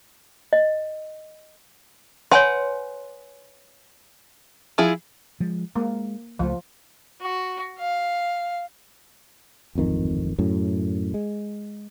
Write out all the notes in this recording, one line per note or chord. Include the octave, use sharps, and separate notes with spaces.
D#5
B4 C#5 F#5 G#5 C6
F3 E4 G#4
F3 G#3
G#3 A#3
C#2 F3 F#3 A3
F#4
F5
D1 G#1 F2 D#3
F#2 A2
G#3